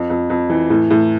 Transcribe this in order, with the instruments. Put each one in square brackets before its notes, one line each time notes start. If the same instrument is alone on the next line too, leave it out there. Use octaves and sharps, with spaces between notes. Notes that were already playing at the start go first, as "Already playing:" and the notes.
Already playing: [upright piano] F2
F2
F2
E3
A2
A2